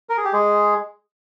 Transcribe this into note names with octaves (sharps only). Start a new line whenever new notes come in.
A#4
G#4
G4
G#3 G#4